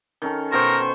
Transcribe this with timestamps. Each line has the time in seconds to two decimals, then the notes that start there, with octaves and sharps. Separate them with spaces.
0.22 D#3 C#4 A4
0.52 B2 A#4 C5 G5 C#6